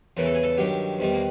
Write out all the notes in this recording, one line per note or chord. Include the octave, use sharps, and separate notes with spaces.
E2 C#3 E3 A#4
A4
G#4
A4
G2 D#3 F#3 G4
E2 C3 D#3 G3
A#3